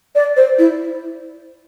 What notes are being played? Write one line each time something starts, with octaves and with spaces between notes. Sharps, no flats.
D5
C5
E4